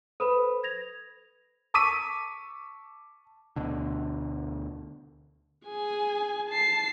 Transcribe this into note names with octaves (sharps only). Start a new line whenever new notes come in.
A4 B4 C5 B5
G#6 A#6 F7
A5 C#6 D6 E6 B6 D#7
D2 B2 D3
G#4 G#5
A5 C7